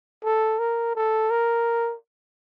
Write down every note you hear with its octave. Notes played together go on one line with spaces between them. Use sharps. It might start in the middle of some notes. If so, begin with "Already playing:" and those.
A4
A#4
A4
A#4